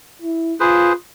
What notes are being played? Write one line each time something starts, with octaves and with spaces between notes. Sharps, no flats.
E4
F4 G#4 B4 C5